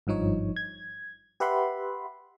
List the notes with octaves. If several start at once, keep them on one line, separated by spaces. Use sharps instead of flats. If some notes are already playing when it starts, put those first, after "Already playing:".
G#1 G2 F3 D#4 C#5
G#6
G4 B4 E5 F#5 B5 C6